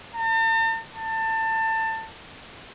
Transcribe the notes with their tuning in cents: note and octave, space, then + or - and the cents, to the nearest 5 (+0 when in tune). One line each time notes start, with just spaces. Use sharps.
A5 +45
A5 +25